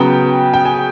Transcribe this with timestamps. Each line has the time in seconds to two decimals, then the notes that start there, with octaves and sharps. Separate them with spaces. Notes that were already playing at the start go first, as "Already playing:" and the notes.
Already playing: C#3 F#3 B3 G5
0.54 G5
0.65 G#5